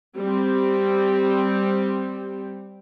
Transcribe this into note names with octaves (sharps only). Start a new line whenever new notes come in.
G3 C4